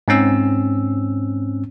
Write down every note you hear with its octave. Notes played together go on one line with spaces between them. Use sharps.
G#2 C4 C#4 E6